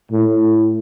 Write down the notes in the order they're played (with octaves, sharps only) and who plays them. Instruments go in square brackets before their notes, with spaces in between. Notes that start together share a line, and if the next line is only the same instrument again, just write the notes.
[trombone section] A2